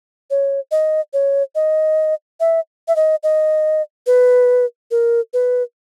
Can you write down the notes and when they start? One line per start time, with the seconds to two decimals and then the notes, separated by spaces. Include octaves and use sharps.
0.30 C#5
0.71 D#5
1.13 C#5
1.55 D#5
2.40 E5
2.88 E5
2.96 D#5
3.23 D#5
4.07 B4
4.91 A#4
5.34 B4